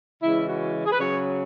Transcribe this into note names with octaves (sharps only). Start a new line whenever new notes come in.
C#3 E3 G#3 E4
F#4
G#4
B4
C#3 F#3 C#4 C#5